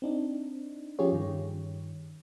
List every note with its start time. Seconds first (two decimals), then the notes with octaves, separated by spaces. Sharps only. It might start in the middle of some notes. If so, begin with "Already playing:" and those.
0.02 C4 D4 D#4
0.99 F3 C#4 F4 G4 G#4 C#5
1.12 G2 D#3